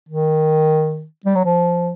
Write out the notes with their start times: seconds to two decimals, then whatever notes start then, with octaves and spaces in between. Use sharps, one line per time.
0.09 D#3
1.26 G3
1.36 F#3
1.45 F3